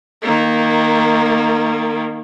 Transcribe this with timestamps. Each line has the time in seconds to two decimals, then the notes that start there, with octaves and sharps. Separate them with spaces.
0.22 D#3 A#3